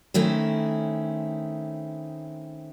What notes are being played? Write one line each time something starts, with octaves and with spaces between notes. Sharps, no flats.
D#3 A3 C4 C#4 E4